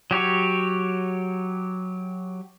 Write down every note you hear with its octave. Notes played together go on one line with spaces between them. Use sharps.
F#3 G4 C#5